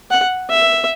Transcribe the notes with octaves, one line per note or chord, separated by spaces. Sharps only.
F#5
E5